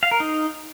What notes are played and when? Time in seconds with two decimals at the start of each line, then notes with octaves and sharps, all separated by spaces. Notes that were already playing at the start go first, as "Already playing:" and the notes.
0.03 F5
0.11 A#4
0.20 D#4